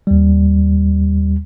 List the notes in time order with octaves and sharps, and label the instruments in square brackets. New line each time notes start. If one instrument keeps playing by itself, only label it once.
[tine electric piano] D#2 G3